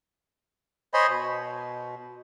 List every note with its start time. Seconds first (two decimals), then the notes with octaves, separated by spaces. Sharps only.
0.94 C5 C#5 D#5 G#5 B5 C6
1.09 B2